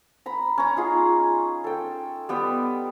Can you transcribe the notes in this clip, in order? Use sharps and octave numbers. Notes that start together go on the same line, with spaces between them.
A#5 B5
C#4 A#5
D#4 F4 G#4
A4 G5
G3 B3 G5